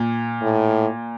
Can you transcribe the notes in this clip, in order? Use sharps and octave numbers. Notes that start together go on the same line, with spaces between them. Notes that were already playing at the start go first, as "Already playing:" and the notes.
Already playing: A#2
A2